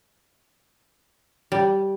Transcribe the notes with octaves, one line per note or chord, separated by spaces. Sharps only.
G3